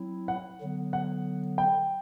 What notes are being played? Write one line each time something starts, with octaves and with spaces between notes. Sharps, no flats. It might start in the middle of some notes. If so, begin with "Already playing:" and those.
Already playing: F#3 C4 E4
F#5
D3 F#3 B3
F#5
G5